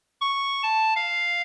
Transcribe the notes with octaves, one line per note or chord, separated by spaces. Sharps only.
C#6
A5
F5